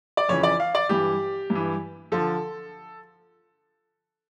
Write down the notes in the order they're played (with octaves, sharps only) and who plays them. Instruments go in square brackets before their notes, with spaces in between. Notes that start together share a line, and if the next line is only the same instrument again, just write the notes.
[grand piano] D5
F2 C#3 E3 C#5
D5
F5
D5
G2 E3 G4
G2
E3
D3 F3 A4